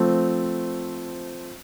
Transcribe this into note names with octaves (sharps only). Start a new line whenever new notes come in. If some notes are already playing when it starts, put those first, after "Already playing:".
Already playing: F3 A3 C4